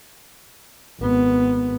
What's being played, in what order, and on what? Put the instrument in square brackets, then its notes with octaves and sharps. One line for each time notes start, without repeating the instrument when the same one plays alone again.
[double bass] G#1 B3